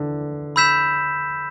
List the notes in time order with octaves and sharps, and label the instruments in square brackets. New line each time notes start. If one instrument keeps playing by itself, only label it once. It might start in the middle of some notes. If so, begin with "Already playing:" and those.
Already playing: [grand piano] D3 E3
[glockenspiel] B5 E6 G6 B6 E7